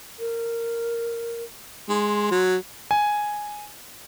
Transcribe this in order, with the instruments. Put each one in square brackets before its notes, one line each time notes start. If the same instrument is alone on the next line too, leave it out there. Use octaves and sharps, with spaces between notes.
[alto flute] A#4
[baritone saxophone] G#3 [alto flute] C6
[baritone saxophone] F#3
[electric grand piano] G#5